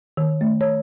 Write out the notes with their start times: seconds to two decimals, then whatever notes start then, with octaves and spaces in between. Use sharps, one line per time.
0.17 D#3
0.41 A3
0.61 C#5